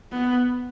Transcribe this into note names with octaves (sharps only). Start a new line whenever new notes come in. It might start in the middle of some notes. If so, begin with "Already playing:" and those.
B3